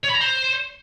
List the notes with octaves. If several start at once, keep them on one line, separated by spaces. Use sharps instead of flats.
C#5
B5
A#5
C5